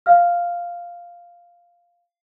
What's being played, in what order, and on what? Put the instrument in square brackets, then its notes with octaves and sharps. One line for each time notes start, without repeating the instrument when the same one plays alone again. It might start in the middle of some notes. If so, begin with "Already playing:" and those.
[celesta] F5 F6